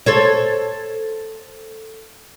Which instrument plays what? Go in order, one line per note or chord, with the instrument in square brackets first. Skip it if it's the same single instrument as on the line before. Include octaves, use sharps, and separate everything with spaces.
[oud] A4 C5 C#5